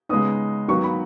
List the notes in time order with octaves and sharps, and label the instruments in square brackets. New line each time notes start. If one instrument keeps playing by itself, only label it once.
[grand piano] C#3 G#3 B3 D#4 [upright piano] D#6
[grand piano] D#3 F#3 B3 [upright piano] C#6
[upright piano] B5